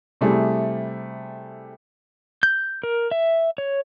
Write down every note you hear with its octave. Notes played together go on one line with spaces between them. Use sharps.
C3 G3 A3 E4 G#4
G6
A#4
E5
C#5